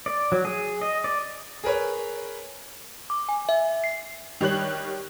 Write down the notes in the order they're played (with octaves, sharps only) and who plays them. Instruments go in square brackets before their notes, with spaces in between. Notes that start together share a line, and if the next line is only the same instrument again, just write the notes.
[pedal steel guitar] D5
F#3
G#4
D#5
D5
[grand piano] G#4 A#4 B4 C#5
[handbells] D6
G#5
E5
C7
[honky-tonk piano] D#3 G3 C#5 F#6 F#7